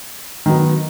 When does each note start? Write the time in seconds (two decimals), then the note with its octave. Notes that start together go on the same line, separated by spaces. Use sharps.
0.46 D#3 F#3 B3